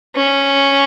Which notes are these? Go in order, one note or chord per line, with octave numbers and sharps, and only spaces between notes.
C#4